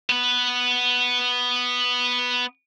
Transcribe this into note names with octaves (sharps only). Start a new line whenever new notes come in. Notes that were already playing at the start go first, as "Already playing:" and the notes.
B3 B4